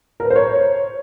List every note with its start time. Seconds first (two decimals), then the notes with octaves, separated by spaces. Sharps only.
0.20 A#4
0.25 B4
0.30 C5
0.36 C#5